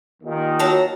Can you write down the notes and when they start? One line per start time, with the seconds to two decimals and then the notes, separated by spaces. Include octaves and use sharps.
0.22 D#2 A#2 D#3
0.59 F#3 A5 A#5